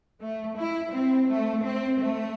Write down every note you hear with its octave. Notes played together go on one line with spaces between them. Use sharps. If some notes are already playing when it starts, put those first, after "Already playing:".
A3
E4
C4
A3
C4
A3